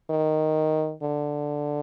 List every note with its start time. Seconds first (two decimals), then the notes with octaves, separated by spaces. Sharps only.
0.10 D#3
1.02 D3